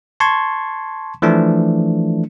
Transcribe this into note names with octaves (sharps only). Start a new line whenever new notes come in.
A5 C6 C#6 G#6
E3 F3 A3 D4